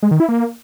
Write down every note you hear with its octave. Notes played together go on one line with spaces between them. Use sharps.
G#3
D#3
E4
A#3